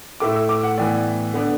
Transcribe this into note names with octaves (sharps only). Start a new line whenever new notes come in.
A2 A3 E4 D6
E6
D6
F#5
A2 E3 B3 D5
D3 B3 D4